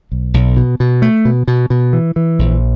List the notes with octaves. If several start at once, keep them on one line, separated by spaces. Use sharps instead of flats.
B1
B1
B2
B2
A3
B2
B2
B2
E3
E3
A#1